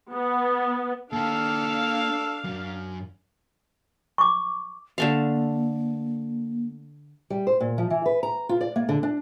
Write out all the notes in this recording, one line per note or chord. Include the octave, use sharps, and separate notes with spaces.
B3
A#3 D4 A4 F5 G5
F#2
C#6 D6
D3 A3 A#3 F5
G3
C5
A#2
F3
E3
B4
A#5
F4
D5
A#3
D3
D4